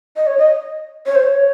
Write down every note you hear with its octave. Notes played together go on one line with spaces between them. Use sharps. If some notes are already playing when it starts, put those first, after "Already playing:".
D#5
C#5
D#5
C#5
C5
C#5